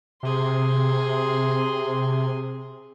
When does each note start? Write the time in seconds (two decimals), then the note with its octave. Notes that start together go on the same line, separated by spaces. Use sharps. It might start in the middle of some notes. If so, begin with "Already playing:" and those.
0.23 C3 G#4 C6